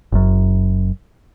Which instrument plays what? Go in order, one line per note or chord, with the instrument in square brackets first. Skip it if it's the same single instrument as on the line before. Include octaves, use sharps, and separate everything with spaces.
[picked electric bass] F#1 F#2